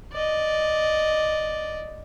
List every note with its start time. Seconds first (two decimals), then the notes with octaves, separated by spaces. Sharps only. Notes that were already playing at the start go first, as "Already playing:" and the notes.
0.13 D5 D#5